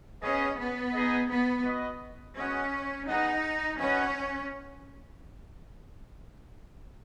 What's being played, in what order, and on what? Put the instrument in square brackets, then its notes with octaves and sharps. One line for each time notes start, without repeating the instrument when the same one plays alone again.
[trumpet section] B3 G#4 D#5 [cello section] C#4
[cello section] B3
[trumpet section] D#4 G#4 D#5
[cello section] B3
[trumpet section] F#4 B4 D#5
[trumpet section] G#3 B3 F#4 D#5 F#5 [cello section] C#4
[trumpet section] B3 G#4 D#5 F#5 [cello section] D#4
[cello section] C#4 [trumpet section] F#4 B4 D#5 F#5